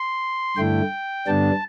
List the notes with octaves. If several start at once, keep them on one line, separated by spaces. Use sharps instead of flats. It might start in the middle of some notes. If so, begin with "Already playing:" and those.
Already playing: C6
G2 D3 A3 E4 G5
G2 D3 G3 B3 D4 A5